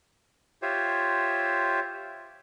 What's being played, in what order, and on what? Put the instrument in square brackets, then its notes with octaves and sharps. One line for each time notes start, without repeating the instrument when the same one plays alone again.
[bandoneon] F4 G4 C5 C#5 E5